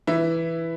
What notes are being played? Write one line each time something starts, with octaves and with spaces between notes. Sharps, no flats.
E3 E4